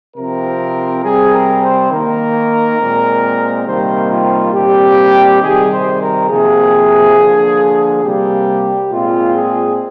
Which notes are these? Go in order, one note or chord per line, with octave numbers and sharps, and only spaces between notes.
C3 F3 C4 A#4
C3 G3 C4 G#4
A#4
C5
D#3 A#3 A#4
A#2 G#3 C4
C3 D#3 G3 A#3 C5
F4
A#2 G3 C4 G4
C3 D#3 G3 G#4
C5
A#4
C3 F3 A#3 G#4
D3 F3 A#3
C3 G3 A#3 G4
A#2 G#3 C4 F4
G#4